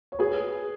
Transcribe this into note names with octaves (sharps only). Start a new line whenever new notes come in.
C#5
G#4 B4